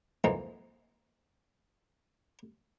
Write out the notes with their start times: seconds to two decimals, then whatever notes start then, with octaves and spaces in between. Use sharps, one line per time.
0.24 F2 G#2 E3 G#3 A#3 D#4